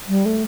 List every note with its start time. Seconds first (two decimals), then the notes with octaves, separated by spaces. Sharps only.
0.08 G3
0.25 A3